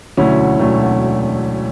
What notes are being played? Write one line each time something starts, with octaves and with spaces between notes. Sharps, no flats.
E1 D2 D3 F#3 A3 C#4 E4
E1 D2 D3 F#3 A3